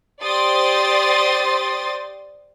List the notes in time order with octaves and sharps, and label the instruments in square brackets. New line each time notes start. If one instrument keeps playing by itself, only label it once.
[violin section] G4 C5 D5 C6 D#6 A6